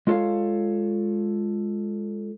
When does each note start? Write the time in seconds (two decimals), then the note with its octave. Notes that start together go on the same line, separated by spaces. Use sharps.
0.07 G#3 F4 A4 C#5 F5